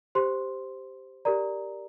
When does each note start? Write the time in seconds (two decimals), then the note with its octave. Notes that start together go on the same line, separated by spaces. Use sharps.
0.15 G4 C5 C6
1.25 G4 A#4 D5 A#5